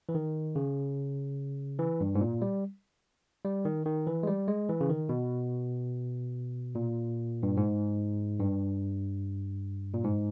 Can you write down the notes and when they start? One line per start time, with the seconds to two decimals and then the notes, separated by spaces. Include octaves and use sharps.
0.09 E3
0.15 D#3
0.55 C#3
1.79 E3
2.00 G2
2.15 G#2
2.21 A#2
2.42 G3
3.45 G3
3.65 D#3
3.86 D#3
4.07 E3
4.23 G#3
4.27 G3
4.48 G#3
4.69 E3
4.81 C#3
4.89 D#3
5.09 B2
6.75 A#2
7.43 G2
7.57 G#2
8.39 G2
9.94 A#2
10.04 G#2